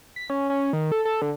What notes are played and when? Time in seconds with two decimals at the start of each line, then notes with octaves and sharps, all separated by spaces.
0.16 B6
0.30 C#4
0.50 C#4
0.73 D#3
0.92 A4
1.05 A4
1.22 D3